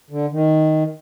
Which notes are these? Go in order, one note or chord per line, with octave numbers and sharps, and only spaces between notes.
D3
D#3